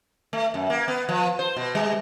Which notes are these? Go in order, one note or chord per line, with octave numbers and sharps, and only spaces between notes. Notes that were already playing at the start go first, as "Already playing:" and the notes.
A3
F#2
A#3
B3
F3
C5
B2
G3